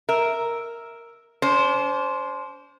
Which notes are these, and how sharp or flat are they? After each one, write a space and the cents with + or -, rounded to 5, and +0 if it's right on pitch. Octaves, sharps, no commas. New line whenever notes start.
A#4 +0 E5 +0
D4 -45 C5 +0